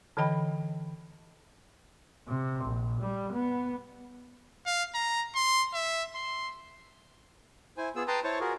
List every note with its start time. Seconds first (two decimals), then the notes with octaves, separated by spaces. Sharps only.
0.17 D3 E3 C#5 D#5 G5 B5
2.27 C3
2.64 A#1
3.01 G3
3.33 B3
4.66 F5
4.95 A#5
5.36 C6
5.73 E5
6.15 C6
7.77 E4 C5 G#5
7.96 B3 F4 G#4 E6
8.08 B4 G5 A5 A#5 C6 D#6
8.24 E4 C5 C#5 A5 C#6
8.40 F4 F#4 G#4 A#4